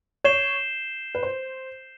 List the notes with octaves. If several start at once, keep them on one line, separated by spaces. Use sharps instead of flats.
C#5 G6 C7 E7 G7
B4
C5